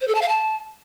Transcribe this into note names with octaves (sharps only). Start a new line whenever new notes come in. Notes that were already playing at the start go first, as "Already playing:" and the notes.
C5
A4
A5
F5
A5